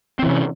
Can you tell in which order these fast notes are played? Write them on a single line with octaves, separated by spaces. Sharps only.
C4 E3 C3 C#4